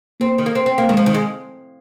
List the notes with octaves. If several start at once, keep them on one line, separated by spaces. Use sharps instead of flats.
A#3 C4
D#3
A#3
C4
C4
A#3
D#3 G#3
F3
D#3
G#3